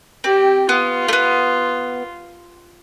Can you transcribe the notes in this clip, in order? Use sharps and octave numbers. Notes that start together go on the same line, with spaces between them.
C4 G4
B3 F4
A3
B3